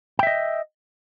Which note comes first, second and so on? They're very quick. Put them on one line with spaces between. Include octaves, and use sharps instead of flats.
G5 E5 D#5